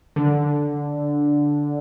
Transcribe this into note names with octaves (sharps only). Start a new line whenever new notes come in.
D3